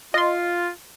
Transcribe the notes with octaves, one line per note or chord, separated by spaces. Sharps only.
F4 D#5 C6